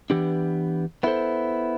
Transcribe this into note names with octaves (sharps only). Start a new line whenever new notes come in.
E3 B3 D4 G4
B3 E4 A4 C5